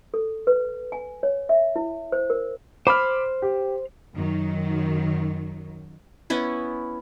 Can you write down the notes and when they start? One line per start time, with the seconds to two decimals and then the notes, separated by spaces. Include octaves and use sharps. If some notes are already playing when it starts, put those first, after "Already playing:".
0.14 A4
0.47 B4
0.92 G#5
1.23 C#5
1.49 E5
1.76 E4
2.12 C5
2.30 A#4
2.87 C5 B5 D6 F6
3.42 G4
4.14 F#2 D#3 F#3
6.30 B3 C#4 E4